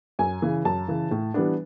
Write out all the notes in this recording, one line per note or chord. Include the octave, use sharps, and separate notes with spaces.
F#2 G#5
C#3 E3
F#2 A5
C#3 E3
A2
E3 G3 B3 D4